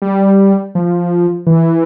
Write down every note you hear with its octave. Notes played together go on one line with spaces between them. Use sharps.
G3
F3
E3